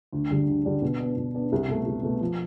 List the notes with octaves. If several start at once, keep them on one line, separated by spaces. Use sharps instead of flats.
D2
D3 G3 D4
D2
D3 G3 D4
B2
B3 D4
B2
B3 D4
C2
B2 A3
C2
B2 A3
F3